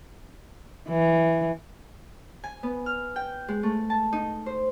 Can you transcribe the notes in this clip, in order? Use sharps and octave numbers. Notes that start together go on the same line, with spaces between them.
E3
G#5
B3
F6
G5
G#3
A3
A5
D#4
C5